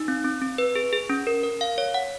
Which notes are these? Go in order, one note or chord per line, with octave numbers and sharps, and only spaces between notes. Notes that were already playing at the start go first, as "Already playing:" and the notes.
Already playing: D#4
C4
C4
C4
B4
G#4
G#4
C#4
A#4
A#4
F5
C#5
F#5